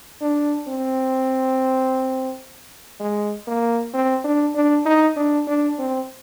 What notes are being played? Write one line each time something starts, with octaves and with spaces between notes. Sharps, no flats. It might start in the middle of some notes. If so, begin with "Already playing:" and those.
D4
C4
G#3
A#3
C4
D4
D4
D#4
D4
D4
C4